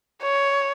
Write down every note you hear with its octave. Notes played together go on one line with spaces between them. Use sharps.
C#5